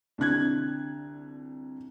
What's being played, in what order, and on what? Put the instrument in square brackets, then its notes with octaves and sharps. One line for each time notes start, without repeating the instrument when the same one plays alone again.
[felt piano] C2 D3 F#6 G#6